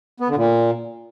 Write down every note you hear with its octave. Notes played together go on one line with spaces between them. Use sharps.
B3
D3
A#2